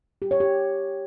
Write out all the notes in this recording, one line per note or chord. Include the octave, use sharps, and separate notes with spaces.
G4
C#5
G4